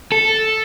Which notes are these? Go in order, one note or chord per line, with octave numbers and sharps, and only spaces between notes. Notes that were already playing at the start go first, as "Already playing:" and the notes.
A4